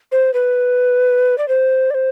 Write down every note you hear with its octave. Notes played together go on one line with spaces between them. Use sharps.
C5
B4
D5
C5
D5
C5